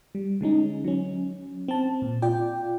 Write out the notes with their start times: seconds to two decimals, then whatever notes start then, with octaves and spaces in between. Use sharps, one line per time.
0.15 G3
0.41 D3 G#3 C#4 D#4
0.85 F#3 C#4
1.68 C4 A5
2.02 A#2
2.22 F4 D5 G5